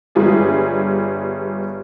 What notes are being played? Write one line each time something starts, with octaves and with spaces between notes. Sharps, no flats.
G1 G3 F4 G#4 D5